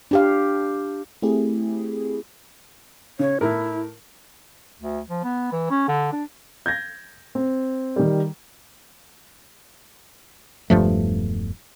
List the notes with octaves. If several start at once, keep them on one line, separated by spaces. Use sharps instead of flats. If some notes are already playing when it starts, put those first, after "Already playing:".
D4 G4 F5
A3 C4 E4 G4 G#4
C#3 C#5
A2 E4 A#4
D2
F3
B3
E3
C#4
D3
D4
G6 G#6 A#6
C4
D#3 G3
E1 G2 F3 A3